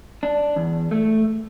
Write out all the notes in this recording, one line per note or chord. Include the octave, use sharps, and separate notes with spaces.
D4
E2
A3